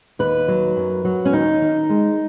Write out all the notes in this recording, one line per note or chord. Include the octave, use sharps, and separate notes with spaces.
D#2 B4
F#3
F#2
F#3
C#4
D#2 D#4
D#3
G#3